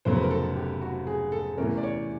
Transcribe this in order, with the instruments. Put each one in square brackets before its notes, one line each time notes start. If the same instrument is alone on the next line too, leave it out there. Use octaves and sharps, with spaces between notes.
[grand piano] F1 F2 C#3 F#3 B3 C5
B4
A#4
A4
G4
F#4
G#4
A4
E2 C3 E3 A3 C#4 A#4
D5
C#5